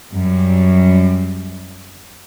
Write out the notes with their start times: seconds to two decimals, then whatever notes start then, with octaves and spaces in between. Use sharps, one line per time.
0.14 F#2 G3